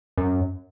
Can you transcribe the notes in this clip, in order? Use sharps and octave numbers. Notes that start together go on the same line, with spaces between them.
F#2